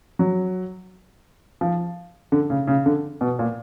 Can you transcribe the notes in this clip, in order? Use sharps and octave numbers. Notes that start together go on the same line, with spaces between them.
F#3
F3
D3
C#3
C#3
D3
B2
A#2